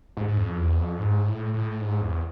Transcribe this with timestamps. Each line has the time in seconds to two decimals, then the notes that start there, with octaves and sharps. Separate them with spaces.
0.17 G#2
0.28 G#2
0.37 F2
0.57 E2
0.78 F2
0.99 G#2
1.26 A2
1.54 A2
1.81 G#2
2.01 E2